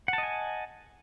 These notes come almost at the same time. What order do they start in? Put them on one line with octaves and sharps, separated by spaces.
F#5 A5 D#5 G#5